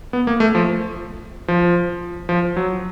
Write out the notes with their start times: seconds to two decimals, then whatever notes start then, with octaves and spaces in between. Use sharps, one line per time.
0.13 B3
0.27 A#3
0.40 A3
0.55 F3
1.48 F3
2.29 F3
2.56 F#3